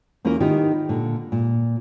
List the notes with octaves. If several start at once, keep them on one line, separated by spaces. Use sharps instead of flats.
E2 A#3 C#4 E4 F4 A#4
D#3 B3 E4 F4 G4
A#2 D3
A#2